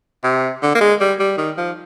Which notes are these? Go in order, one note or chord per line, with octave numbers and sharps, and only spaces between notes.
C3
D3
A#3
G#3
G3
G3
D#3
F3